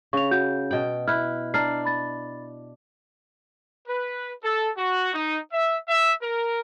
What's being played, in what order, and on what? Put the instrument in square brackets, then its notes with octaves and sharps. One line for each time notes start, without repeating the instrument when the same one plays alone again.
[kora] C#3 [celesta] C#6 F7
[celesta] F#4 F#5 G6
[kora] B2 G5
[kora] E4 [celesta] F6 F#6
[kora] D4 [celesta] A#5 F6 C7
[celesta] B5 A6
[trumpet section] B4
A4
F#4
D#4
E5
E5
A#4